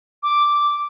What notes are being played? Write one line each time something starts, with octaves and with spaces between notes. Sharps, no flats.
D6